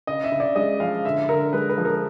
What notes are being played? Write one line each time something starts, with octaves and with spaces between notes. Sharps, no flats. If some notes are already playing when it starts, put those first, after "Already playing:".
C#3 D#5
E5
C#3
D5
G#3 D#5
F3 F5
D3 E5
D3 A#4
G#3 B4
B4
F3
A#4